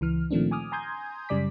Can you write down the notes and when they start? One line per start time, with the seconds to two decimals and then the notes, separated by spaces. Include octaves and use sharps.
0.01 C#2 E3 F6
0.31 A#2 D#3 F3 A3 C4 D4
0.51 G#5 D6 D#6 F6
0.72 G#5 A#5 C6 D#6 G6 G#6
1.29 F#2 C#3 G3 D5 D6 B6